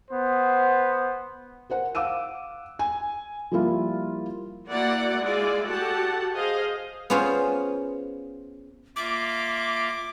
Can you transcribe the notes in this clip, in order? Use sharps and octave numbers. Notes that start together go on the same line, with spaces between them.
B3 C5
A#4 C5 F#5
F5 F#5 D6 E6 D#7
G#5
F3 G3 A#3 E4 F4
A#3 E4 F#4 D5 F#5
G#3 E4 F4 D5
F#4 G4 A4 F#5 A5
G#4 C5 D#5 F5
B3 C#4 F4 G#4 C5
A#3 F4 E5 D6